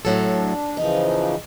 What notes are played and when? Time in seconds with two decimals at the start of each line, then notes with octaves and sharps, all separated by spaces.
0.05 A2 F#3 A4
0.34 D4
0.77 C#3 E3 F3 D#4